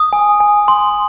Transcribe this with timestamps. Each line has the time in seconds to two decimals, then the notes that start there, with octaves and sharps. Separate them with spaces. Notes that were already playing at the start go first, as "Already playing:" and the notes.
Already playing: D#6
0.13 G#5
0.40 G#5
0.68 C6